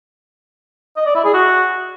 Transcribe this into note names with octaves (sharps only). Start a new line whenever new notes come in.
D#5
D5
E4
G#4
F#4